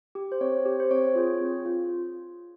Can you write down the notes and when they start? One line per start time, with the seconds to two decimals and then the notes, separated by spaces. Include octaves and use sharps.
0.15 G4
0.32 C5
0.41 C4 C#5
0.66 G4
0.80 C5
0.91 C4 C#5
1.15 F4 G#4
1.41 C4
1.66 F4